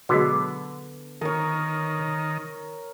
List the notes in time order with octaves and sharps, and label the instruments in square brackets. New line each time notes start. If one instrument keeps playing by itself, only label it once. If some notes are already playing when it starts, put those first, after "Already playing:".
[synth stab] B2 F#3 G#3 [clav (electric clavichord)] D3 B3
[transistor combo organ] D#3 [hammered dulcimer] A#4 C#5